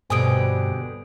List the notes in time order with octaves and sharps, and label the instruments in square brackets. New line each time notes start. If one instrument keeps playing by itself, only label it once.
[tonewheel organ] G2 [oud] B2 D3 C4 [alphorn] G3 [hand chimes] G#5 D#6 D7